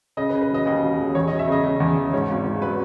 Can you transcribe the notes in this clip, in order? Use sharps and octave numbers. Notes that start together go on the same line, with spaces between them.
C#3 D#5
B4
C#3
B4
E1 D#5
D#2 D#5
E1
E1
E2 C#5
E1 D#5
E5
C#3 D#5
C#3
E2
E2
G#2 C#5
G#1
G#2
F#3 B4